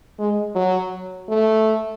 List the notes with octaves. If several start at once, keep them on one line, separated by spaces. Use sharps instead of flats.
G#3
F#3
A3